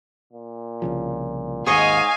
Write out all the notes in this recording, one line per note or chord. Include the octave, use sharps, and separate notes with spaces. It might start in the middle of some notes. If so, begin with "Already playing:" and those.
A#2
C2 C#3 F3
G#1 D#2 G#2 G#4 C#5 D#5 F5 G#5